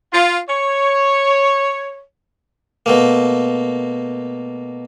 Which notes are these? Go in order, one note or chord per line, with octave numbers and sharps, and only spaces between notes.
F4
C#5
B2 A3 A#3